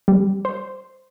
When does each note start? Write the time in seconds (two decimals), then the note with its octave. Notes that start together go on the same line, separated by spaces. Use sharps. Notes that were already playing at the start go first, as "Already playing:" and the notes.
0.08 G3
0.45 C5